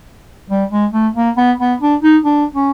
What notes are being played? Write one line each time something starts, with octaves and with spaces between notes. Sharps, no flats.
G3
G#3
A3
A#3
B3
B3
D4
D#4
D4
C#4